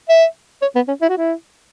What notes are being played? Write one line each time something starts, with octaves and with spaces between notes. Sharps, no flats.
E5
C#5
B3
C#4
E4
F#4
E4